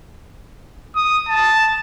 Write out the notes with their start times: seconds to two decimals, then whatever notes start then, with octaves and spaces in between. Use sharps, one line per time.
0.96 D#6
1.29 A5